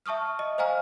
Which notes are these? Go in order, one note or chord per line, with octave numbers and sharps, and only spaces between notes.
E5 A5 C#6 D#6 F6
D#5
C5 D#5 F5 G#5 A#5 F6